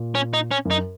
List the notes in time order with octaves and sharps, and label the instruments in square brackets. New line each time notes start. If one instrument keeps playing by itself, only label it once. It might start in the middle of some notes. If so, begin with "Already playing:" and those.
Already playing: [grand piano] A#2
[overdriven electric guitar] C#4
D#4
C#4
[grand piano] F#2
[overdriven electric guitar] D#4